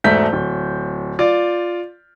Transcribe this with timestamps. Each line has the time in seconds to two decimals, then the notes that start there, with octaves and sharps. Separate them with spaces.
0.04 E1 G#2 A3 G6 B6
0.33 D1
1.19 F4 D5